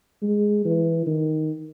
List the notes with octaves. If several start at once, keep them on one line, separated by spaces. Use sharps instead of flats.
G#3
E3
D#3